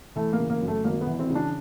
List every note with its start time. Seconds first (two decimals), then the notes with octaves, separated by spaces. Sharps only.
0.16 E3 A3
0.33 A#3
0.38 C#3
0.50 A#3
0.61 F#2
0.68 A3
0.84 G#1 A#3
1.01 B3
1.07 E3
1.19 C4
1.30 C#3
1.35 D4